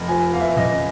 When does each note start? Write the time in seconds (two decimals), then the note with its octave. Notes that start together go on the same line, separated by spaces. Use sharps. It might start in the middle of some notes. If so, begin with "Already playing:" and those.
Already playing: F1
0.08 F3 G#5
0.33 E2 F5
0.41 E5
0.57 C#3 D#5